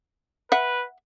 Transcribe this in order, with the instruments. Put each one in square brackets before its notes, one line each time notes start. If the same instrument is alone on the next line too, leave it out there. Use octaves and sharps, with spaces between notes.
[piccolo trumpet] B4 [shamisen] E5 F#5